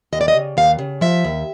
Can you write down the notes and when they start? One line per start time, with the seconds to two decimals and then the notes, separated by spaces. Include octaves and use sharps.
0.13 D#2 D#5
0.21 D5
0.28 D#5
0.35 C#3
0.57 D#2 F5
0.79 C#3
1.01 F3 E5
1.25 D#2